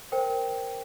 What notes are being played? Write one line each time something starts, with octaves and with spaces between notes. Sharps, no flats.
A#4 C5 G5